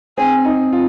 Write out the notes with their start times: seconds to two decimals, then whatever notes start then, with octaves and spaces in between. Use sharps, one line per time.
0.18 C4 G#4
0.45 D#4
0.73 F4